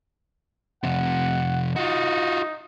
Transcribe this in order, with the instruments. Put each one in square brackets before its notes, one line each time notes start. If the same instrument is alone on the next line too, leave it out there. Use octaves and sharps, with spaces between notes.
[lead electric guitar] F2 C3 [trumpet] F#5
[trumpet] D#4 [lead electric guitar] F4 F#4